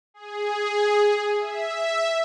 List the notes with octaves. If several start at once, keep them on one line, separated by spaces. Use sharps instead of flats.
G#4
E5